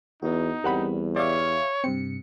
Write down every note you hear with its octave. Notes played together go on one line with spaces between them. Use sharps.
E2 B3 D#4 F#4
E2 G3 C4 A#4 F#5 B5
G4 C#5 D5 E5 F5 D6
G2 C3 C4 C#7